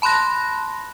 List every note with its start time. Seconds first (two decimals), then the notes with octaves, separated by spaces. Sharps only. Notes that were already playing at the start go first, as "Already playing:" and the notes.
0.02 A5 B5 C6 F#6 A#6